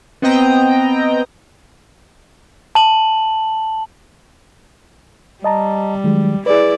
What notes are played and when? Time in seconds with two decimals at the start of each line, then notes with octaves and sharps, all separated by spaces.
0.22 B3 C4 D#5 G5 A#5
2.75 A5 F#7
5.44 G3 D#5 A5 A#5
6.04 D#3 F#3 G#3
6.46 E4 G#4 B4 D5